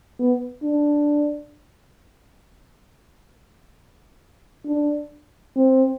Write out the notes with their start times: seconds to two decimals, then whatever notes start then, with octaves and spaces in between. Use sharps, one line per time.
0.19 B3
0.64 D4
4.66 D4
5.56 C4